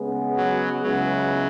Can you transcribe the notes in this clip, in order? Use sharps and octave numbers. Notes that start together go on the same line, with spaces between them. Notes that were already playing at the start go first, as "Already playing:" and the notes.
Already playing: C#3 G#3 B3
F#3
C#2 C#3 F#3 G#3 B3 E4